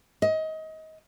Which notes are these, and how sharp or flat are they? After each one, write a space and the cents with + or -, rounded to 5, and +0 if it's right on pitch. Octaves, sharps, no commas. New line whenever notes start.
D#5 +25